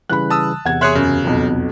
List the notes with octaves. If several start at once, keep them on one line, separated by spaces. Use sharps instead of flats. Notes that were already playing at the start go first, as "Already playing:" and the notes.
C#3 E3 G3 B5 F#6
A5 D#6 E6
E2 C3 F#5 G#6
G#4 C#5 E5 C6 F#6
F#2 C#3
B1 F2